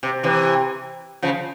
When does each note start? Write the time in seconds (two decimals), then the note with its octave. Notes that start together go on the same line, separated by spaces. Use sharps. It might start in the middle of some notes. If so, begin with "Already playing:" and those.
0.03 C3
0.23 C3 E3
1.22 C#3 F3